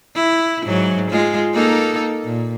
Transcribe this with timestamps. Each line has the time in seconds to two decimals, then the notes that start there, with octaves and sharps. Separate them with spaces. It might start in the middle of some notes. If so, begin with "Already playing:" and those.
0.16 E4
0.65 G#2 F#3
1.11 G#3 F4
1.54 A#3 D#4 A4
2.24 A#2